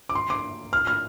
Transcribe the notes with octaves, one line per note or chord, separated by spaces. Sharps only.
D6
C6
D6
F6
F6